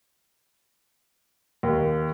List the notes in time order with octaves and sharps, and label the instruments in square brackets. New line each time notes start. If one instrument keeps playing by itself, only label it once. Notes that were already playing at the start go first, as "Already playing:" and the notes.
[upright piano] D#2